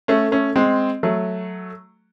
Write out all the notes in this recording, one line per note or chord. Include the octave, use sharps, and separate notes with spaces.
A3 C#4
A3 C#4
G#3 C4
F#3 A3